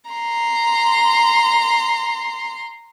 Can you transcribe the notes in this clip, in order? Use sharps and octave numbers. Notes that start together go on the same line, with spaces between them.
A#5 C6